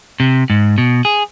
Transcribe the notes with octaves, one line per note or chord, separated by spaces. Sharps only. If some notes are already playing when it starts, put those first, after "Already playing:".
C3
G#2
B2
G#4